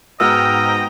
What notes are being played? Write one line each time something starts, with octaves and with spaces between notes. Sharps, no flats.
G#2 B3 F#4 D#5 G5 A#5 E6 F6